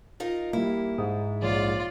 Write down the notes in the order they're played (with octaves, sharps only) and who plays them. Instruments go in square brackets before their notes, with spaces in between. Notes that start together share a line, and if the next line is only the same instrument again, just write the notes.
[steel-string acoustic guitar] D#4 F4 A#4
[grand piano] G3 A#3 [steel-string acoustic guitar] E4
[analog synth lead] G#2 [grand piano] D#6
[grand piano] A#1 C#5 [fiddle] F4 D5